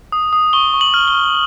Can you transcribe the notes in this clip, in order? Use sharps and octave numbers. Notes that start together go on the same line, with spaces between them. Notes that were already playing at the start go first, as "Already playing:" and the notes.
D#6
D#6
C#6 G7
C#6
F#7
F6
G7
F6